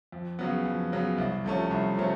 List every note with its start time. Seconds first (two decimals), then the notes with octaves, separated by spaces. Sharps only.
0.12 F2
0.39 C#3 F#3 B3
0.65 F2
0.92 C#3 F#3 B3
1.18 C2
1.45 C3 F3 A3 C#4
1.71 C2
1.98 C3 F3 A3 C#4